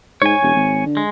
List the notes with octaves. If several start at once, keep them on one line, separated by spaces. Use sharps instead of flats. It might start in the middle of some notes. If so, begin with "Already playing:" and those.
G#2 C#5 G#5
E1
G#1
D3
G#3